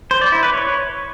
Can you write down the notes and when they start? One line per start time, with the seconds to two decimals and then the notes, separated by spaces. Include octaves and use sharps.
0.11 C5
0.21 D5
0.32 E4
0.43 B4
0.53 C#5